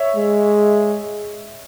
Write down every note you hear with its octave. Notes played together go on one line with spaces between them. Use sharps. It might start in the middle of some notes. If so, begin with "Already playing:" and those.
Already playing: C#5 E5
G#3